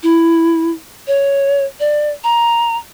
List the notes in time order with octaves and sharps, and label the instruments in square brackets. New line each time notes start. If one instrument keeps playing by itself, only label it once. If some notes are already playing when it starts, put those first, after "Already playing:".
[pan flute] E4
C#5
D5
A#5